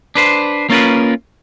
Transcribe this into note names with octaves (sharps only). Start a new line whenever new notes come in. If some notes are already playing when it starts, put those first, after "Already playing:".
D4 B4 C5
A#3 C#4 F4 A#4 B4